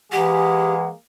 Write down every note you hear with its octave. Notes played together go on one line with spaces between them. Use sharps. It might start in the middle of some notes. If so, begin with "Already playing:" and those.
E3 G#3 A#3 G4 G#4 F#5